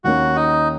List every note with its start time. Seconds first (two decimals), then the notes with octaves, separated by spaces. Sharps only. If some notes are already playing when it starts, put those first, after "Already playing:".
0.04 D#2 D#3 A#3 C#4 F#4
0.36 D#4